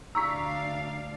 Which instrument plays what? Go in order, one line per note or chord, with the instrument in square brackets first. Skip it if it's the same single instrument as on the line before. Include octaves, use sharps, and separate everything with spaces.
[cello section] D2 D4 F5 [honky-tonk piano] A#5 C#6 B6 [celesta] E6